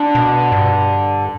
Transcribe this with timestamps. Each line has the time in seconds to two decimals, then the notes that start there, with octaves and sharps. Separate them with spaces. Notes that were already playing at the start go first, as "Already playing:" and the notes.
Already playing: D3
0.15 B2
0.52 G2